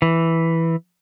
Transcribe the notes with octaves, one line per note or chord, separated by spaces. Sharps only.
E3